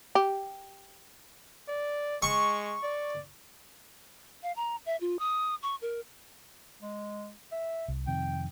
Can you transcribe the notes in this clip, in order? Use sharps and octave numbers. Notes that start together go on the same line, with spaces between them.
G4
D5
G#3 C#6
D5
F5
A#5
E5
F4
D#6
C#6
A#4
G#3
E5
C2
F2 C3 D#3 G5